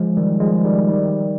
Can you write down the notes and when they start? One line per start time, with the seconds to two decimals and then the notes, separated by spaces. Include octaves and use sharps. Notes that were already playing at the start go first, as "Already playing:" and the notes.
Already playing: F3 G#3
0.17 D#3 G3
0.40 F3 G#3
0.65 D#3 G3
0.88 D#3 G3